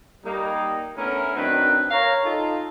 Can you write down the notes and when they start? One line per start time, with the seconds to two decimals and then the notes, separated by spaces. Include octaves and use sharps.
0.25 G3 A#3 D#4
0.96 A3 B3 C#4 D4 E4 A#4
1.35 F#2 D#3 C4 D4 B4
1.91 A#4 C#5 F5 A#5
2.24 D#4 F4 A4